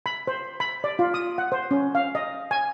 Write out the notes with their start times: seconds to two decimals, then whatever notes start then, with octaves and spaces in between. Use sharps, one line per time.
0.06 B5
0.27 C5
0.60 B5
0.84 D5
0.99 F4
1.14 D#6
1.38 F#5
1.52 C5
1.71 C#4
1.95 F5
2.15 D#5
2.51 G#5